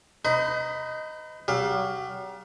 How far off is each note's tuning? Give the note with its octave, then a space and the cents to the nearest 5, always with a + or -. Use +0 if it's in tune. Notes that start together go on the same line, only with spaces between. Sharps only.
D#4 +0 B4 +45 B5 +20
F#3 +45 G4 +40 F5 +15